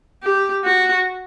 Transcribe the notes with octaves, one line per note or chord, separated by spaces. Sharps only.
G4
F#4